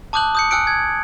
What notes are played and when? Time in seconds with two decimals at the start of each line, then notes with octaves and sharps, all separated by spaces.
0.13 A5 D6 D#6 F#6 G6 F#7
0.35 D#6 G6 C#7
0.51 G#5 E6 F#6 C#7 D7
0.67 G#6